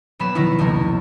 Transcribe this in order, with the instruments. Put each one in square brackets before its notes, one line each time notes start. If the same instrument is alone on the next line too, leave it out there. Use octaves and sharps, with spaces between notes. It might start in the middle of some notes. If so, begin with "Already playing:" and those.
[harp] E1 F#3 B3 B5 E7
B2 D#3 F#3 D#4 E4
F1 C#2 A3 A#3